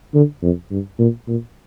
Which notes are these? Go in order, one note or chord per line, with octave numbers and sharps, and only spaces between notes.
D3
F2
G2
A#2
A#2